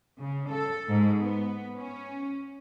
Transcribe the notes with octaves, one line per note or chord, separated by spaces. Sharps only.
C#3
A4
G#2
B3
C#4